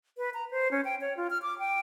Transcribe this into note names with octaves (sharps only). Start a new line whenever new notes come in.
B4
A#5
C5
C#4
G5
C#5
F4
F6
D6
G5